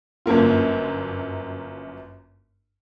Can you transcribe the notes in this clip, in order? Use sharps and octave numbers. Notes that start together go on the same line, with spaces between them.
G1 F#2 A#3 F4